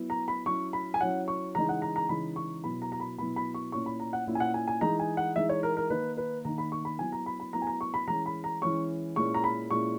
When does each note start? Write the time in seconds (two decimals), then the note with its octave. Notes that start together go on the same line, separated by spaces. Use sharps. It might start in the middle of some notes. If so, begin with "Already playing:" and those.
Already playing: F#3 B3 E4
0.10 A#5
0.28 B5
0.46 F#3 C#4 E4 C#6
0.73 B5
0.94 G#5
1.00 F#3 C#4 E4 F#5
1.28 C#6
1.55 C#3 E3 G#3 D#4 A#5
1.69 F#5
1.82 A#5
1.96 A#5
2.09 C#3 E3 G#3 D#4 B5
2.36 C#6
2.63 B2 F#3 B3 E4 B5
2.82 A#5
2.92 A#5
3.00 B5
3.18 B2 F#3 B3 E4 B5
3.36 B5
3.54 C#6
3.72 A#2 A#3 C#4 E4 C#6
3.86 B5
4.00 A#5
4.13 F#5
4.27 A#2 A#3 C#4 E4
4.35 G#5
4.40 F#5
4.54 G#5
4.68 G#5
4.81 E3 G#3 D#4 A#5
4.99 G#5
5.17 F#5
5.36 E3 G#3 D#4 E5
5.49 C#5
5.63 A#4
5.77 A#4
5.90 D#3 A#3 D#4 B4
6.17 B4
6.45 D#3 A#3 D#4 A#5
6.58 B5
6.72 C#6
6.85 B5
6.99 F#3 B3 E4 G#5
7.12 A#5
7.26 B5
7.40 B5
7.53 F#3 B3 E4 A#5
7.62 G#5
7.67 A#5
7.81 C#6
7.94 B5
8.07 E3 G#3 C#4 A#5
8.26 B5
8.44 A#5
8.62 E3 G#3 C#4 C#6
9.16 A#2 G#3 C#4 E4 C#6
9.34 A#5
9.44 B5
9.71 A#2 G#3 C#4 E4 C#6